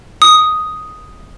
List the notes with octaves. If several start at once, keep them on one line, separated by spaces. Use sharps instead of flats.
D#6